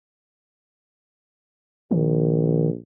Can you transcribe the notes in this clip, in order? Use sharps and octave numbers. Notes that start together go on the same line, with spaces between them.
A#1 D#3